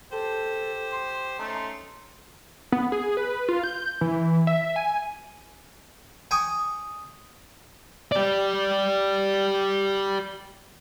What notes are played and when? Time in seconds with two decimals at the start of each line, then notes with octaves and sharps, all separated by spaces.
0.12 G4 A4 C5
0.92 C6
1.39 A3 C#4 D#4
2.72 B3
2.92 G#4
3.17 B4
3.49 F4
3.64 G6
4.01 E3
4.47 E5
4.76 G#5
6.31 G5 G#5 C#6 D#6
8.12 G4 D5